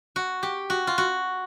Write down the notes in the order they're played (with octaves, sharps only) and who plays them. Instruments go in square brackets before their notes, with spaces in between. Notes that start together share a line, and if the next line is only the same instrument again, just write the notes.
[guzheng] F#4
G4
F#4
F4
F#4